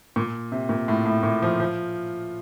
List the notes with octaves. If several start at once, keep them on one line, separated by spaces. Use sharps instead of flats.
A#2
C3
A#2
A2
A2
A#2
F3
F3